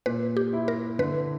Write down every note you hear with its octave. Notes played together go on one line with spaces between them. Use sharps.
A#2 B4
G4
E4
A#4
D3 B4